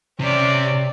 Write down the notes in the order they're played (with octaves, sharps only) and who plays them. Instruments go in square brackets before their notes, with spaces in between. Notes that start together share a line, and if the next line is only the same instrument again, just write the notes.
[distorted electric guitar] C3 [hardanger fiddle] C#4 D5